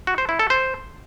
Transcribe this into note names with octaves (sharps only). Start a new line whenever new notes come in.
F#4
C5
E4
A4
C5